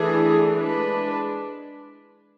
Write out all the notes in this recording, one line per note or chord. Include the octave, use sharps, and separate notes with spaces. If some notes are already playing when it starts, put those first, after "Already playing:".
Already playing: E3 A3 D4 G#4
G#3 D4 B4